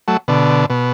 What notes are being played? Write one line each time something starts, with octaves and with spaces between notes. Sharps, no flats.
F#3 A3
B2 D3
B2